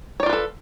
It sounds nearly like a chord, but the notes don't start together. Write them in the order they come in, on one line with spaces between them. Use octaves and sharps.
C#5 D5 F4 B4 A4